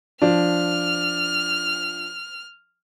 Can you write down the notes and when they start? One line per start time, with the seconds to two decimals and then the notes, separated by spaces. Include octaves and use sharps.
0.22 F3 D4 F6